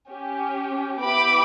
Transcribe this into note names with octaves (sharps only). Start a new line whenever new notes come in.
C#4 G4
B3 E4 G4 B5 D6